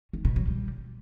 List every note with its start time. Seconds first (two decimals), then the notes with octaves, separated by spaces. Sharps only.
0.13 D#3
0.25 B2
0.36 F#3
0.47 G3